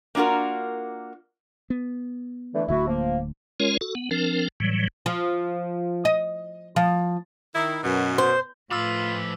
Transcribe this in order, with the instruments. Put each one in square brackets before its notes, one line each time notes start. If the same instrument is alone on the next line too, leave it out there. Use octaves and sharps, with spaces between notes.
[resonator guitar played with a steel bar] A#3 D4 F4 F#4 A#4
[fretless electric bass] B3
[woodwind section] D3 E3 A3
[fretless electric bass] D1 D3 A3 [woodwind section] E4 F#4
[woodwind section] F3 A#3
[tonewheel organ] G#3 C#4 F4 A#4 C#5
F#4 A4
B3
F3 C4 D4 A#4
A2 E3 F#3 G3
[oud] F3
D#5
F3
[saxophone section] D#3 E4
F#2 B2
[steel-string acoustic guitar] C5
[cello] A2 B4 [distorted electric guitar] F3 B5 [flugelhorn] F4 [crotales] D6 E6